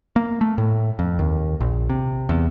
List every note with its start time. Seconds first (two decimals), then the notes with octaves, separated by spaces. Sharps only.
0.16 A#3
0.41 A3
0.58 A2
0.99 F2
1.19 D#2
1.61 A#1
1.90 C3
2.29 E2